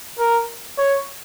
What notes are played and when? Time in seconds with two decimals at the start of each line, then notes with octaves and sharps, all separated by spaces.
0.19 A#4
0.78 C#5